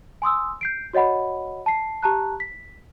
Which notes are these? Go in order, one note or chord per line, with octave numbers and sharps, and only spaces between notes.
G#5 C6 D#6 E6
G6 C7 D7
F#4 C#5 D#5 F#5 B5
A5 C7
G4 A5 A#5 F#6
B6